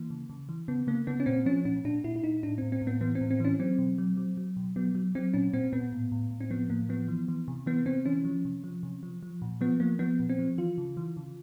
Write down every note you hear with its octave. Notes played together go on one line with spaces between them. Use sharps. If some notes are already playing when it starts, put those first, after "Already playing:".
Already playing: E3 A#3
C#3
C#3
E3
C#3 B3
C#3 A#3
C#3 B3
C#4
A#2 C4
F3 C#4
A#2 C#4
A#2 D4
A#2 E4
E4
A#2 D#4
A2 D4
A2 C4
C4
A2
B3
E3 B3
C4
A2
C4
E3 C#4
F#3 C4
B2
F#3
F#3
F#3
B2
F#3 B3
F#3
F#3 C4
A#2 C#4
A#2 C4
A#2 B3
A2
A2
A2
C4
F3 B3
A2 A#3
F3 B3
E3
E3
C3
E3 B3
C3 C4
E3 C#4
F3
C3
F3
C3
F3
F3
A#2
F3 B3
F3 A#3
F3 B3
A#2
C4
F3
E3 F4
C#3
E3
C#3